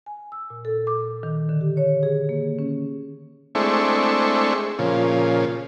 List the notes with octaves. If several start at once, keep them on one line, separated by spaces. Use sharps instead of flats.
G#5
E6
A#2
A4
D6
D#3
D3
G4
C#5
G#4
A#3
C#4
G#3 A3 C4 D4 E4 C#6
A#2 C#3 F3